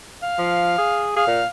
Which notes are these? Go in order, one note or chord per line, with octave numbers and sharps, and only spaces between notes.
F5
F3
G#4
G#4 F5
A#2